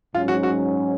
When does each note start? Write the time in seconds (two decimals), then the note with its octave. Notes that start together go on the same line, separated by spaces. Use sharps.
0.14 G#2 F#3 C#4 F4
0.28 F#4
0.43 F#4